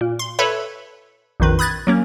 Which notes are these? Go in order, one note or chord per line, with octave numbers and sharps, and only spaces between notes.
A#2
C6
A4 B4 C#5 E5 B5
A#1 F2 D#3 B4
B5 D#6 F#6 G#6 A6
F#3 A#3 C#4